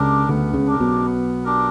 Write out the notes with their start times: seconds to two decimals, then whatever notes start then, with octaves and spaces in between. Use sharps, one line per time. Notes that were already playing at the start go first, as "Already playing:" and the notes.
Already playing: C#2 C#3 D4 G4 A#4
0.29 D2 D3 B3
0.54 C#2 C#3
0.67 D4 G4 A#4
0.80 B1 B2
1.06 B3
1.44 D4 G4 A#4